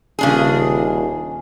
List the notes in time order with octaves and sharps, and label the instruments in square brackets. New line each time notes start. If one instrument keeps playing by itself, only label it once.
[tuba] D#1 [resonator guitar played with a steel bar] C#3 D4 G#4